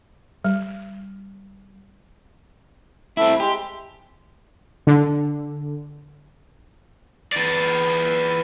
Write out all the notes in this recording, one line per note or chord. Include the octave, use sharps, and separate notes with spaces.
G3
A3 C4 E4 E5 B5
G#3 G4
D3
E3 D5